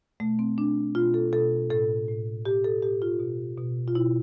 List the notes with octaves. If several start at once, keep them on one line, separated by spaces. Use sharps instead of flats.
B2 A3
C4
B2 D4
B2 F4
A4
B2 A4
A2 A4
A2
A2 G4
A4
A2 G4
F4
B2
B2
F4
B2 E4